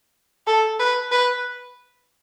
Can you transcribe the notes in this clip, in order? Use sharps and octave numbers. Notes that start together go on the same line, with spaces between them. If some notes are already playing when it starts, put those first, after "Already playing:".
A4
B4
B4